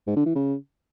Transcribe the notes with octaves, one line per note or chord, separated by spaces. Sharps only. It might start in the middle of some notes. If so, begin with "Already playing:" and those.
G#2
D3
E3
C#3